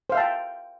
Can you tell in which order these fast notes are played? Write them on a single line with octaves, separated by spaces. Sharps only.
C5 F5 E5 A5 G5